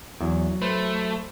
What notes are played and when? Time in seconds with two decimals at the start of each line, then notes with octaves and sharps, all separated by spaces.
0.21 E2 F#3
0.62 A3 B4 C5